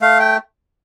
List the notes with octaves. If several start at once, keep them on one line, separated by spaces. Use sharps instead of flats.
A3 F5
G5